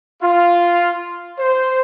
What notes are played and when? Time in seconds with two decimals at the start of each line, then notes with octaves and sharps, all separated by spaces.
0.22 F4
1.38 C5